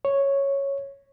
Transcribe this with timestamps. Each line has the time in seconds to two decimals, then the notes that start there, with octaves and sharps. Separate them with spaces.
0.05 C#5